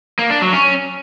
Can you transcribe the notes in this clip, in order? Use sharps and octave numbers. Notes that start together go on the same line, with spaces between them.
A#3
D4
F#3
C#4